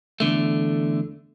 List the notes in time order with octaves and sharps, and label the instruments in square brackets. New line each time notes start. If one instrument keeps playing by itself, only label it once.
[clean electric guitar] E2 D3 A3